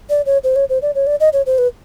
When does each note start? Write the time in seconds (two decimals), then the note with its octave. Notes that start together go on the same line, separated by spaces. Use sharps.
0.10 D5
0.26 C#5
0.44 C5
0.56 C#5
0.70 C5
0.82 D5
0.95 C#5
1.07 D5
1.20 D#5
1.33 C#5
1.46 C5
1.58 B4